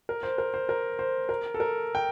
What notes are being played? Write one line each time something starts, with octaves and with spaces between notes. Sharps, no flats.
A#4
C5
A#4
C5
A#4
C5
A#4
A4
A#4
G5